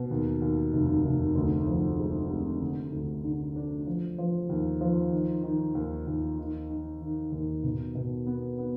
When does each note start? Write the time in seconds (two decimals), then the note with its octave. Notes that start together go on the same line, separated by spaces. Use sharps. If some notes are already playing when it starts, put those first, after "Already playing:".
Already playing: B2
0.11 D#2
0.42 D#2
0.73 F1
1.05 F1
1.35 D2
1.67 F3
1.99 G#3
2.30 C3
2.61 D3
2.93 D2
3.24 D3
3.56 D4
3.86 F3
4.18 F3
4.49 D#2
4.81 F3
5.12 D#3
5.43 D#3
5.75 D#2
6.07 D#2
6.39 D#3
6.70 D#3
7.02 D#3
7.32 D#2
7.63 B2
7.95 B2
8.26 B3
8.58 B3